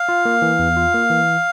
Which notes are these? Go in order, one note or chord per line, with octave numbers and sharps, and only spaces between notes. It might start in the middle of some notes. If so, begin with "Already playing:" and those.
Already playing: F5
F4
A#3
E3
E2
F4
A#3
E3